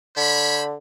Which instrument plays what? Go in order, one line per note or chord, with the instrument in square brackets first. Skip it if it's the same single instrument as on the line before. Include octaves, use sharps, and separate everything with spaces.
[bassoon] D3 [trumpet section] C5 C#5 B5